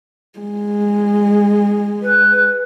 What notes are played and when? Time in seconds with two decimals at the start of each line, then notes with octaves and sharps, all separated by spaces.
0.39 G#3
2.02 B4